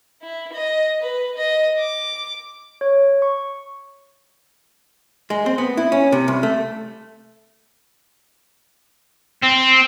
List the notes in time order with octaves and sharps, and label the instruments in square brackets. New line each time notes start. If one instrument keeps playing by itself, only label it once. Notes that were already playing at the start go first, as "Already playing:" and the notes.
[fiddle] E4
D#5
B4
D#5
D6
[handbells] C#5
C#6
[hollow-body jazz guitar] G#3
C4
B3
E4
C#4
C3
C2
A3
[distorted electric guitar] C4